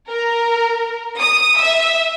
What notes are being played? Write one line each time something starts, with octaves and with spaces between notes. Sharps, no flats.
A#4
D#6
E5